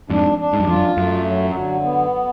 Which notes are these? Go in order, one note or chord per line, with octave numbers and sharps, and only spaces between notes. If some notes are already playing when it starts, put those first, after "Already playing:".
F2 G#2 D4
D4
G#2
F#2
F2 F4
F#2
F#2 A3
F#3
D3
B3